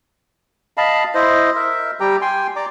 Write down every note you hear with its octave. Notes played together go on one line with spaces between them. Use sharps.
D#5 F5 A5 B5
E4 C5 D#5
A#4 E5
G3 G4 G5 A#5
G5 G#5 C6
D5 A#5 D6